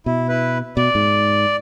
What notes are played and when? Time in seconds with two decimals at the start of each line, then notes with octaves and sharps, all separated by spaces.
0.06 B2 E4
0.29 E4 B4
0.77 B2 D5
0.95 G#2